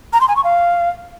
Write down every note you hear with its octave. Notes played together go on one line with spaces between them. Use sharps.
A#5
C6
G#5
C#6
F5